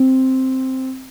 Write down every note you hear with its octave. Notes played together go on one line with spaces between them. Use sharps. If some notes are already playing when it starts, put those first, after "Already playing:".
Already playing: C4